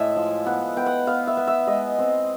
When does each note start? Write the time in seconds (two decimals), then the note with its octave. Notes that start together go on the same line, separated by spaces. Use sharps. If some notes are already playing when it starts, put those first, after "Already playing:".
Already playing: A2 G#3 E5
0.16 F3
0.46 B3 F#5
0.76 B3 G5
0.86 F#5
1.07 B3 F5
1.27 E5
1.37 B3
1.47 E5
1.67 G#3 D#5
1.99 C4